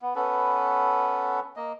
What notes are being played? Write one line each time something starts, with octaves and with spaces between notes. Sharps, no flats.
B3
B3 C#4 A4 B4
A#3 D#5